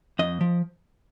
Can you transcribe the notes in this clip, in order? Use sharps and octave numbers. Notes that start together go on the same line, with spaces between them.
F2 D#5
F3